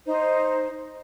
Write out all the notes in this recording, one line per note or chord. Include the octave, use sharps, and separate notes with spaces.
D#4 C5